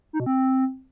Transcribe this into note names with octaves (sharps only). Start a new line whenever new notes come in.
D#4
B2
C4